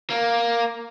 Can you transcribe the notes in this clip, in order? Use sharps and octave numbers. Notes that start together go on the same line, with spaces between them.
A#3